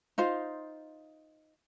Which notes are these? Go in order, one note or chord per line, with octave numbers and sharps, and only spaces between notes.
D#4 F4 C5